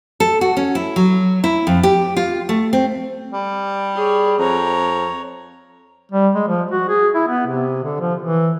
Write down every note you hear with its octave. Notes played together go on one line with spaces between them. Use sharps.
A4
F#4
C#4
E4
F#3
E4
F2
G4
F4
A3
C4
G3
G#4 C#5
F2 C#5 A#5
G3
G#3
F3
F#4
G#4
E4
B3
C3
D3
F3
E3